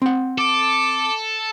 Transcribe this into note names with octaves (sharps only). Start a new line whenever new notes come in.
C4 F#5
A4 D6